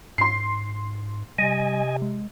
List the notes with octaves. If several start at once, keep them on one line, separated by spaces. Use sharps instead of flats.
G#2 C6 C7
C3 G3 D#5 G#5
G#3